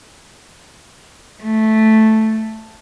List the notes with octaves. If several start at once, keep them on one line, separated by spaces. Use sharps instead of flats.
A3